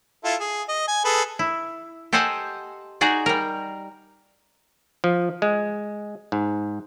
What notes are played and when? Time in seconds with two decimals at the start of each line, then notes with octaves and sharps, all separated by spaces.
0.24 E4 F4 A4
0.40 G#4
0.68 D#5
0.88 G#5
1.05 G#4 A4 B4
1.39 E4
2.13 G4 A4 C5 D#5 F#5 G#5
3.01 D#4 F#4 G#4 D5
3.26 G3 A#4
5.04 F3
5.42 G#3
6.32 G#2